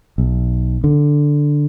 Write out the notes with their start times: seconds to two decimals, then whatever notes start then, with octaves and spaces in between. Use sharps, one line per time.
0.18 B1
0.84 D3